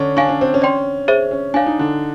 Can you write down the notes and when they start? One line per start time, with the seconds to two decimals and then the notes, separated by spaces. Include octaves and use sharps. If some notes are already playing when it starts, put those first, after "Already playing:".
Already playing: D3 C#4 D4
0.16 D4 F5 G#5 C#6
0.29 C#4
0.41 C4
0.54 C#4
0.62 D5 G5 C6
1.08 G#4 C5 E5
1.31 C#4
1.54 D4 C#5 F5 G#5
1.66 D#4
1.79 D3 D4